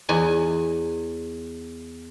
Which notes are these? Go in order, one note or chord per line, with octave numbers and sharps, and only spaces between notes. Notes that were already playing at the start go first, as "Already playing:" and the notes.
E2 G#5